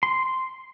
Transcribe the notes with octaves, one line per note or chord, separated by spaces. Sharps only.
C6